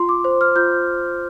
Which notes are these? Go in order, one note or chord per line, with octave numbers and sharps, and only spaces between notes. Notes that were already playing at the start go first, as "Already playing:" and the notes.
Already playing: F4 C6
D6
C5
F6
F4 G6